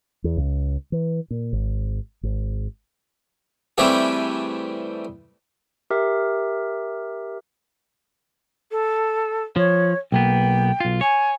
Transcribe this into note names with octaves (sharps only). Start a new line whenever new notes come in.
E2
C#2
E3
A#2
G#1
G#1
C3 E3 G3 A3 G4 G#4
G4 A#4 E5
A4
F3 C#5
B1 A#3 B3 G5
B1 F4
C#5 G#5